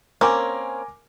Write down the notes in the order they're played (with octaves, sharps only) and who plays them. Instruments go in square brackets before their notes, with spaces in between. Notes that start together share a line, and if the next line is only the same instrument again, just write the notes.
[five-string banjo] A#3 C4 C#4 [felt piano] A#4 G#5 D6